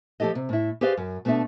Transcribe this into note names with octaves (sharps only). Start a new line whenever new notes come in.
F3 A3 G4 A4 D#5
C3
A2 E4
G4 G#4 B4 C5 D5 F5
F#2
B2 A3 B3 D4 E5